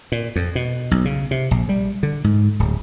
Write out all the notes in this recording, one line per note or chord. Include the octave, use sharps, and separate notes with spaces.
A#2
F2
B2
B1
C#3
C3
A#1
G3
D3
G#2
D1